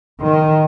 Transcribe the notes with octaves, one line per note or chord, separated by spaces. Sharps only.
D#3